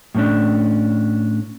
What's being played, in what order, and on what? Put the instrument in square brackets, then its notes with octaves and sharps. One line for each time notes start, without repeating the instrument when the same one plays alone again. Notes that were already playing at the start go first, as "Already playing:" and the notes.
[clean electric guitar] A2 G3 A3 C#4 D4